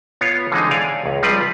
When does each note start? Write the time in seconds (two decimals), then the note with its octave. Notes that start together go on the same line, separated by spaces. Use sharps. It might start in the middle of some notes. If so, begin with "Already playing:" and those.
0.21 B3 F4 C#5
0.52 D3 E3 G#3 C4 D#4
0.71 C#5 D5 F5 G#5
1.06 C#2
1.23 F3 G3 C4 F4 B4 D5